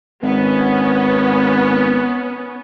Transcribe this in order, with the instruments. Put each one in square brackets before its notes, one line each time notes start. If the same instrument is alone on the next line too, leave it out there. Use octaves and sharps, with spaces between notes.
[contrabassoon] G#1 [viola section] B3 C#4